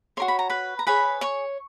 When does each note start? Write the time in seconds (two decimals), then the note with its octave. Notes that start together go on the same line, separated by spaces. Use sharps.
0.17 F#4 A#4 C#5 C6
0.28 B5
0.39 A#5
0.49 B4 B5
0.79 A#5
0.87 G#4 B4 C#5 B5
1.21 C#5 C#6